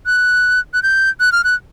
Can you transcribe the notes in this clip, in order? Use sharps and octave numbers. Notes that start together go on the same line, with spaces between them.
F#6
F#6
G6
F#6
F6
F#6